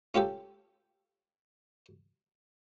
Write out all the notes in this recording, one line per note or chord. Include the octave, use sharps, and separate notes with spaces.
C#4 F4 G4 A4